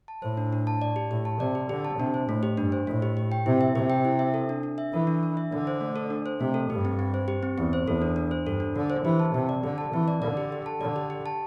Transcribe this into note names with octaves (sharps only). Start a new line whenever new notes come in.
A5
A2 C5
D4
D4
A5
D5
G4
A2 G4
A5
C3 D5
G4
D3 G4
A5
C3 D4
C5
A2 A3
G4
G2 D4
C5
A2 A3
G4
G4
G5
C3 E4
E5
C3 G4
G5
E4
E5
A4
D4
D4
E5
E3 A4
D4
D4
E5
D3 D4
C5
A3
A4
D4
C5
C3 A3
A4
G2 G4
C4
C4
C5
G4
C4
E2 C4
C5
E2 A4
D4
D4
C5
G2 A4
D4
D3 D4
C5
E3 G4
A5
C3 C4
D5
D3 G4
A5
E3 C4
D5
D3 D5
G4
G4
A5
D3 D5
G4
G4
A5